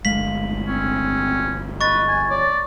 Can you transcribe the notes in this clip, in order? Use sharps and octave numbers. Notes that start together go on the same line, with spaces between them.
G1 G#3 A3 F5 B6 F#7
C4 C#4
B4 D#5 C#6 A6
G#5
C#5 D5